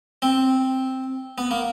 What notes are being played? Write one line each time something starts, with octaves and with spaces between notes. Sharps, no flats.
C4
B3
A#3